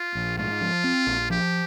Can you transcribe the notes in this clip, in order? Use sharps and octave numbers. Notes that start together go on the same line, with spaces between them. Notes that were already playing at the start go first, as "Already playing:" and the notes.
Already playing: F4
A#1
G#2 F4
F3
C4
A#1
F3 G4